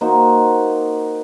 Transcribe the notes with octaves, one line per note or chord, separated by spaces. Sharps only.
A#3 D#4 F#4 C5